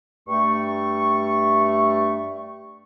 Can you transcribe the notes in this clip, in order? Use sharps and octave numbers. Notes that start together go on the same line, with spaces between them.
G2 A3 C#6